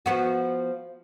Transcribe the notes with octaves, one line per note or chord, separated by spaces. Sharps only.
F3 B3 F#4